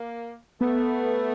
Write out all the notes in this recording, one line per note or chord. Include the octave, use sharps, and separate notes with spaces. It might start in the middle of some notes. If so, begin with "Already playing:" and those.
Already playing: A#3
A3 B3